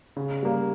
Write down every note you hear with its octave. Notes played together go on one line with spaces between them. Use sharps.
C#3
G3 A#3